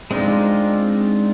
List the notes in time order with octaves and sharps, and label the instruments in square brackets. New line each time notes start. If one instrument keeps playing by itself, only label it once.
[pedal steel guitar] G#3 C4 D4 D#4 F4